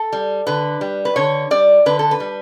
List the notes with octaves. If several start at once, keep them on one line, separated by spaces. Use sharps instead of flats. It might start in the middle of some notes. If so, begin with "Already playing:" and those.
Already playing: A4
G3
D3 B4
G3
B4
D3 C#5
G3 D5
D3 B4
A4
B4
G3